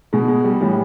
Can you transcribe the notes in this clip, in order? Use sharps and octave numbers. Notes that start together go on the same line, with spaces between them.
B2 G#3
G#3
G3
A2 E3 G3